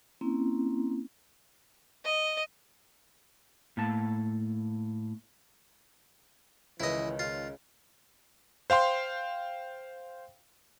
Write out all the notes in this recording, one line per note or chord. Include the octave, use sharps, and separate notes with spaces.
A#3 C4 C#4 E4
D#5
A2 A#3 A5
C#2 D#3 E3 C#4 E4 B4 D#5
C#3 F4
C5 F5 G5 C6